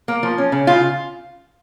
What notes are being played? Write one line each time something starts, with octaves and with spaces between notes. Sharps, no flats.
A#3
F3
C#4
C#3
C#3 F4